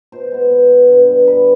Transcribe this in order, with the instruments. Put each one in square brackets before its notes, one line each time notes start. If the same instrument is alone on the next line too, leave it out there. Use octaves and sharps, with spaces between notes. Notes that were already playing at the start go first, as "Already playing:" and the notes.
[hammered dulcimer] B2 C5
G#3 B3
B2
G#3 B3
G2
D3 G3 B3
G2 B4